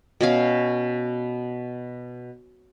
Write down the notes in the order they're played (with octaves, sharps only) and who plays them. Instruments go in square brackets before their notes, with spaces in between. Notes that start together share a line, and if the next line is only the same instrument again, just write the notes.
[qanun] B2 C#4 F5